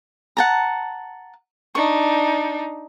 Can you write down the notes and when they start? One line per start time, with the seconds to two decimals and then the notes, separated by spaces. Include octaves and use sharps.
0.37 F#5 A5 A#5
1.75 D4 D#4 C#6